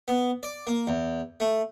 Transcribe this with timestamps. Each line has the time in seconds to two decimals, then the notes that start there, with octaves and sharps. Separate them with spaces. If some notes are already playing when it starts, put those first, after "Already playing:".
0.08 B3
0.43 D5
0.67 A#3
0.87 E2
1.40 A3